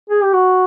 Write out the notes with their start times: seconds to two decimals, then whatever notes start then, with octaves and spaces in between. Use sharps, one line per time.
0.10 G#4
0.23 G4
0.33 F#4